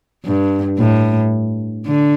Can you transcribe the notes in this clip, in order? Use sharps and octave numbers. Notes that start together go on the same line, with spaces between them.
G2
A2
D3